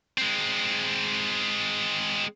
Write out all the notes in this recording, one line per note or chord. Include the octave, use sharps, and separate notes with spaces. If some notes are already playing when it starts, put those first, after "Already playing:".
G#3 C4